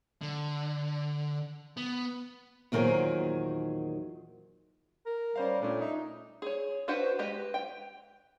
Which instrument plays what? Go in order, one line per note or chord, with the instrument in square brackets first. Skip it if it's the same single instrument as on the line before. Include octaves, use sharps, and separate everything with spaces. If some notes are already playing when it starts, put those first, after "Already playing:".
[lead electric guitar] D3
B3
[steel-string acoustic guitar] E2 A#2 D#3 F#3 G#4 C5
[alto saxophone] A#4
[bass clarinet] G3 [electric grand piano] C#4 C5 F5
[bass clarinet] A#2 [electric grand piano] A3 C#4 [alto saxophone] D4
[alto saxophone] D#4 [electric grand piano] E5
[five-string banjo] G#4 C#5
D4 F#4 B4 C5 F#5
G#3 G4 B4 D#5
G5